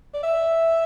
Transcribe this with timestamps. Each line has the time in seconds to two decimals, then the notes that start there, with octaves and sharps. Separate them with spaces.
0.14 D5
0.23 E5